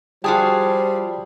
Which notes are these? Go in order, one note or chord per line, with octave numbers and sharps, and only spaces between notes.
F3 G3 F4 F#4 G#4 G5 A5 D#6